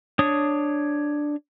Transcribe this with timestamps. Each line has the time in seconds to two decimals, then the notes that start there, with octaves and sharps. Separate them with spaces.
0.19 D4 C#5 D#6